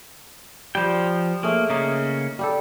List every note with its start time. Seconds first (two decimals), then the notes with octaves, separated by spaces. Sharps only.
0.75 F3 G3 G5
1.43 A3 A#3 C#4 G#4
1.70 C#3 A#3 C#4 D#4
2.39 G3 G4 A4